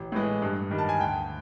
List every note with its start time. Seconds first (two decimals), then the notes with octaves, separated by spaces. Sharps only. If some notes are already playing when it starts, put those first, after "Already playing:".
Already playing: A1
0.12 A2 E3 G#3
0.42 G2
0.71 D#3 G3
0.78 A5
0.89 G#5
1.00 D2 G5